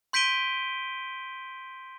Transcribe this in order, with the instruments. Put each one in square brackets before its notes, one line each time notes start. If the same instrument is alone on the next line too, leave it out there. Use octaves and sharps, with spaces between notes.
[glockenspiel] C6 G6 B6 D7 D#7 G7